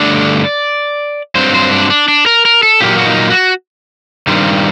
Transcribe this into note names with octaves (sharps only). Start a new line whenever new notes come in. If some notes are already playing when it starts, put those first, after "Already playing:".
Already playing: G2 D3 A3 D4 D5
G2 F#3 C4 C5
C5
D4
D4
D4
A#4
A#4
A4
A#2 F#3 A#3 G4
F#4
D#4
F#4
G2 D#3 G3 C4